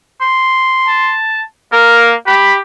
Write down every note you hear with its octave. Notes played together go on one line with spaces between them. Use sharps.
C6
A5
A#3 A#4
G4 B5